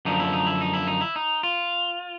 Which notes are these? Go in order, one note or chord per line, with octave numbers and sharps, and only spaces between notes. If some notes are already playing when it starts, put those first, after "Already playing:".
F#2 D3 F3 D#4
E4
D#4
E4
D#4
E4
D#4
E4
D#4
F4